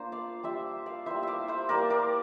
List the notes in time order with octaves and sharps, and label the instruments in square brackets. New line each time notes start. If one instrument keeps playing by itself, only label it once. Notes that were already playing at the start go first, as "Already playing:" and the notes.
Already playing: [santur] A#3 D4 F4 C5
D5 F5
G3 D4 F4 C5 E5
D5 F5
G3 A#3 E4 C5 E5
D5 E5 F5
C5 E5
G3 A#3 E4 A#4 D5
A#4 D5